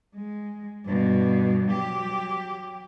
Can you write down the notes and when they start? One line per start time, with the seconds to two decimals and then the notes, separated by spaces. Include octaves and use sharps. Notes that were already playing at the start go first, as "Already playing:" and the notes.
0.16 G#3
0.85 G2 B2
1.68 F#3 G4